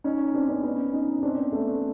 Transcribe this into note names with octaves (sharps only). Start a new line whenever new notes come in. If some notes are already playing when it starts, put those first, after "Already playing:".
C#4 D#4
C4 D4
B3 C#4
B3 C#4
C#4 D#4
C#4
C4 D4
B3 C#4
A3 B3